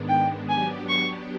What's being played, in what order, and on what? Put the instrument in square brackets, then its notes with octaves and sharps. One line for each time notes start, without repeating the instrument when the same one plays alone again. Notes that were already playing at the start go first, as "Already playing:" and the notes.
Already playing: [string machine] G#2 D#3 G#3 B3 D4
[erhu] G5
[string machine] F#3 B3 D4 G4 [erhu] G#5
[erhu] C#6